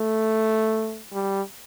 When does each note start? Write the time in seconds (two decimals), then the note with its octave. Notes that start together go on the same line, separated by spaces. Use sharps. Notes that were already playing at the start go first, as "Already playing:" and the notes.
Already playing: A3
1.13 G3